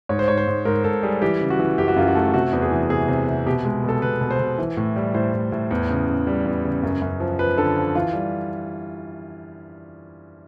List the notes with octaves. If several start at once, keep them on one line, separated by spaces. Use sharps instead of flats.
G#2 C#5
C5
G#2 C#5
C5
G#2
G#2 A#4
G#2 A4
G3 G#4
E3 G4
C#3
F#4
E3
F#2 G4
F#4
F#2 F4
F#4
A3
C3 F#4
E2
G#4
E3
C3 G#4
C3
C3
B2 G4
G#3
B2 A4
B2 B4
B2
C5
B2
E3
A2
G3
A2 C5
A2
A2
E2
C#3
C#3
G3
E2
C#3
F#2
F#2
F3
F3 B4
D3 A4
F3
E3 F4
G3